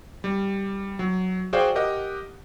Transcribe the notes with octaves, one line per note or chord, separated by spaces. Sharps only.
G3
F#3
F#4 G#4 C5 D5 F5 G5
G4 A#4 D#5 F#5